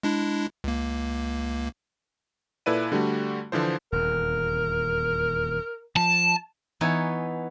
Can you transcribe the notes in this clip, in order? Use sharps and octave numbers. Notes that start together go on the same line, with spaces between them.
G#3 D4 E4
C#2 A#3
A#2 E4 A4 B4 D5 D#7
D3 G3 A3 F#4
D3 E3 F3 C5
D#1 E2 A#4
F3 A5
E3 B3 D#4 C#5 G#5